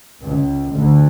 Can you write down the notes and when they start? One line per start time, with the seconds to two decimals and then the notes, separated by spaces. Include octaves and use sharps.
0.21 C#2
0.73 D2